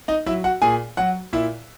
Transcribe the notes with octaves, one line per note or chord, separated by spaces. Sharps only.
D#4 D#5
F#3 E4 E5
F#4 F#5
A#2 G#4 G#5
F#3 F#4 F#5
A#2 E4 E5